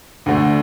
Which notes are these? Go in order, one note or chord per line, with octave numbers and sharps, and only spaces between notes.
D2 D3 A3